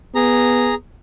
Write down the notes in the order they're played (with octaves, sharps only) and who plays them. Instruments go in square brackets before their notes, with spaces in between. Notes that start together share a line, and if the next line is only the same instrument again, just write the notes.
[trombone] B3 [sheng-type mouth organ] G#4 A#5